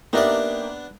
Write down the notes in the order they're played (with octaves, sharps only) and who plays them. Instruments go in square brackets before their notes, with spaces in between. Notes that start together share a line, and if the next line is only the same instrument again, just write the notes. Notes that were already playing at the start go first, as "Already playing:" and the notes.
[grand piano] A#3 G4 [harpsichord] B3 D4 D5 [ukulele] D#4 A#4 E5